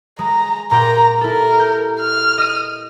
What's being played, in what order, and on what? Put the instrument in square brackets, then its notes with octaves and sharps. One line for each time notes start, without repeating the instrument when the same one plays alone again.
[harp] G#3 [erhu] A#5
[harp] A#2 G4 G5 [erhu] A#5
[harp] E4 A4 [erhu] A#4
[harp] G6
[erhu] F6
[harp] D#5 D#7